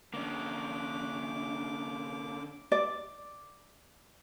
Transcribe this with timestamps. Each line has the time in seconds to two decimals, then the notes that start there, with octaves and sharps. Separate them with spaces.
0.14 D3 A#3 C#4 D4 D6
2.72 D5